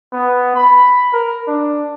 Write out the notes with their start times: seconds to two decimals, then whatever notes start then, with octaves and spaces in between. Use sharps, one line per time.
0.12 B3
0.55 B5
1.13 A#4
1.47 D4